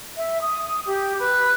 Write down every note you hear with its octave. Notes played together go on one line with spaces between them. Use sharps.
E5
D#6
D#6
G4
B4